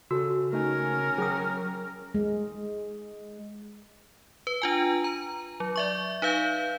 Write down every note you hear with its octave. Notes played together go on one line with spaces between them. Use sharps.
C#3 F#4 A4 E6
A3 C#4 D#4 A#4 G#5
F#3 G#4 G5 D#6
G#3
B4
D4 F4 G#5
A#5
F#3
D5 E5 C#6
D#4 B4 F5 G6